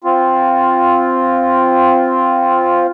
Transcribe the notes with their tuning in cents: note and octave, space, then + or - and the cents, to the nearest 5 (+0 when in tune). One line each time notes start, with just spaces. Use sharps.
C4 +0 F4 +0